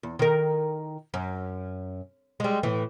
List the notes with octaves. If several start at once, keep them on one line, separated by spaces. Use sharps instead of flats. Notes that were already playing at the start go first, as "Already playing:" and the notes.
E2
D#3 A#4
F#2
G3 G#3
A2 E3